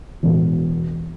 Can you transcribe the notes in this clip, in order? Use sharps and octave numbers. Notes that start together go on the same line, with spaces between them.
E1 E2 B2